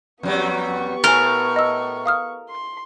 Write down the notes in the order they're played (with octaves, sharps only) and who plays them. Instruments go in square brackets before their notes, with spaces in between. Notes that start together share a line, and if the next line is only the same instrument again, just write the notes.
[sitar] F2 F#3 G3 [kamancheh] B3 C#6
[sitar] A2 [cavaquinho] A#4 [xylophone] G#5 G7
[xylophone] D#5 E6
F5 D#6 F6
[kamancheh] C6